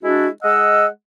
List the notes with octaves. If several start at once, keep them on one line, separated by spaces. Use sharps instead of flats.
G#3 D4 E4 F#4
G#3 D#5 F#5 E6